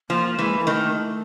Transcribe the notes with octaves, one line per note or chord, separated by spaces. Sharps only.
F3 A#3
E3 G#3
A#3
D#3 A3